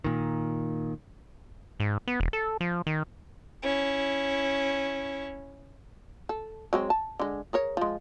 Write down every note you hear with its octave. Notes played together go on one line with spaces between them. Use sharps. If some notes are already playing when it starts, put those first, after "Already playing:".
A#2 D#3
G#2
B3
E1
A4
F3
D#3
C#4 E4
A4
F#3 G#3 C4
A5
D3 G#3
G#4 A#4 C#5
F3 G#3